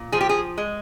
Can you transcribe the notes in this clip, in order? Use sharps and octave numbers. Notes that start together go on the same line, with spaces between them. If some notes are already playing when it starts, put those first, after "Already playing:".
Already playing: A#2
F3 G#4
G4
G#4
G#3